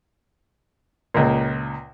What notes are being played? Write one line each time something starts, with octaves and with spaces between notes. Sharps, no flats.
C#2 A#2